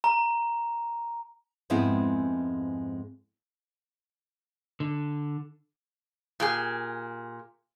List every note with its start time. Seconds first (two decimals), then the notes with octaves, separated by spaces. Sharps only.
0.04 A#5
1.70 F2 G#2 G#3 B3 C4 E4
4.80 D3
6.40 A#2 G4 G#4